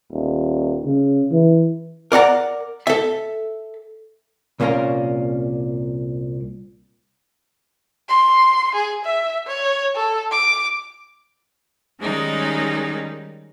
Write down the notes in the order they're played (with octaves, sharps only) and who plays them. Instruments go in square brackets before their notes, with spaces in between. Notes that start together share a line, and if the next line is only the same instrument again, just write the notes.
[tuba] D#1
C#3
E3
[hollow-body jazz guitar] A#4 D5 F#5 A#5
A4 E5
C2 A#2 A#3 C#4 A#4 A#5
[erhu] C6
G#4
E5
C#5
A4
D6
[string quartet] D#3 G3 G#3 C#4 D#4